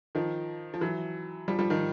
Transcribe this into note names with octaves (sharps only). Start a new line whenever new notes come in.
D#3 F3
F3
E3 F#3
F3 G3
F3 G3
D#3 F3